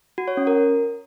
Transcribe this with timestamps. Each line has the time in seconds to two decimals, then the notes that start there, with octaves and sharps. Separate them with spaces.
0.18 F#4
0.28 C#5
0.37 C#4
0.47 A#4